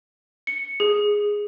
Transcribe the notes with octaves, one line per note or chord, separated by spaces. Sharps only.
C#7
G#4